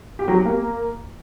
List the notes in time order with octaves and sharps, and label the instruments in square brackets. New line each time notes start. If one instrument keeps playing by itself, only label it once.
[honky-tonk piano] G4
F#3
G4
A#3